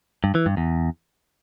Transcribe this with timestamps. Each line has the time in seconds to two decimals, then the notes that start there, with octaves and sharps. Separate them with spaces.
0.24 G2
0.35 E3
0.46 G2
0.57 E2